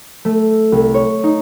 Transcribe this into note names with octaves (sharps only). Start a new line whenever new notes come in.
A3
C2
C#5
D#4